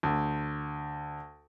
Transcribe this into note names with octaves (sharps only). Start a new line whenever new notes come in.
D2